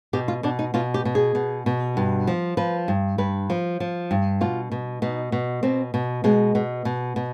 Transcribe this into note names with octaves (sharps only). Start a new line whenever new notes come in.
B2 G4
F4
B2 D4
D#4
B2 F4
G4
B2
G#4
B2
B2
G2
F3
F3 B4
G2
G2 B4
F3
F3
G2
B2 F4
B2
B2 D#4
B2
B2 C4
B2
B2 G#3
B2
B2
B2